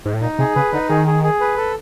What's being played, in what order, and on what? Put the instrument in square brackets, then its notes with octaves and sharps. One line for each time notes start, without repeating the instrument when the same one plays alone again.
[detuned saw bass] G#2
A2
[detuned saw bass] A#2 [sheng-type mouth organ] D#4
[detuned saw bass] C3 [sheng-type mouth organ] G#4
[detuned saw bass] C#3 [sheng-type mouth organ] B4
[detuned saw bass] D3 [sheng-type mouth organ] D#4
[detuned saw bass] D#3 [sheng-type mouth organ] G#4
[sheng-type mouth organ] G#4
G#4
B4
A4